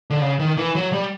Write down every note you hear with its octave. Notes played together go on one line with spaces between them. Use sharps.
D3
C#3
D#3
E3
F#3
G3